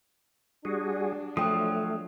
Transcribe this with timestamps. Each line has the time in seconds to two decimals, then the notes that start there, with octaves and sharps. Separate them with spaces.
0.65 G3 D4 F#4 G#4
1.37 F3 F#3 A3 G5 D#6